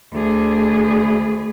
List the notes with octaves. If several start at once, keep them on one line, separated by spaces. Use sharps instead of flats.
D2 G#4